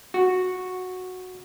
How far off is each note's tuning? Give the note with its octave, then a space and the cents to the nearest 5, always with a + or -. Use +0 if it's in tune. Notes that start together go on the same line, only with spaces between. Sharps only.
F#4 -10